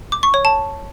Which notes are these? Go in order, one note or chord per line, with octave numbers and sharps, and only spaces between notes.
D6
C#6
C#5
A5